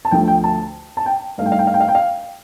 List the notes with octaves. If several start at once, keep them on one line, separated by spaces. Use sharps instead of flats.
A5
D2 D3 F3 A3 G5
G5
A5
A5
G5
G2 D#3 A3 F5
G5
F5
G5
F5
G5
F5
G5
F5